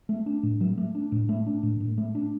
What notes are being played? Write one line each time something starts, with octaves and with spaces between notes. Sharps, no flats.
A3
D4
A2
F#3
A3
D4
A2
A3
D4
A2
A2
A3
D4